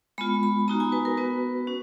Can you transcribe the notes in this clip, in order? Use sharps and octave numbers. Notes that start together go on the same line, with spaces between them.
G#3 B3 F4 B5
B5
B3 D#4 F#4 A#5
G#5
B4
A#4
B3 F#4 B4
C#4 F#4